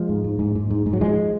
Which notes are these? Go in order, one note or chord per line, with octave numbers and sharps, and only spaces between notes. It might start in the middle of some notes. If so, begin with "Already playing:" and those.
Already playing: F3 G#3
G#2
G#2
G#2
G#2
G#2
G#2
F#3
G#2 F3 G#3